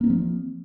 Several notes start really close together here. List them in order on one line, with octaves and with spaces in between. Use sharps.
A#3 C#4 C4 F3